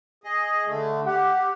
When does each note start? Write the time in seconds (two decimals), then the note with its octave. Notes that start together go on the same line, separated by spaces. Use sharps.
0.24 G#4 D#5
0.66 D3 A3
1.06 G4 F#5